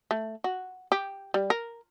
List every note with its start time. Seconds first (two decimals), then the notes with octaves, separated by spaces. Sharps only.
0.11 A3
0.44 F#4
0.92 G4
1.34 G3
1.50 A#4